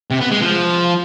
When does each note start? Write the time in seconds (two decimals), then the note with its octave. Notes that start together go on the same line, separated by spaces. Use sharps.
0.11 C3
0.21 B3
0.31 G#3
0.41 F3